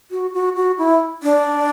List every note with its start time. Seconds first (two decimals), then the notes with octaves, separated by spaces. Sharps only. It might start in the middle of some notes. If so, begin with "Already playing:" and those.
0.11 F#4
0.34 F#4
0.56 F#4
0.78 E4
1.23 D4